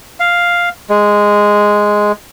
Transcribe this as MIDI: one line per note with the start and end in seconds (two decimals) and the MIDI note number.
0.20 0.69 77
0.90 2.12 56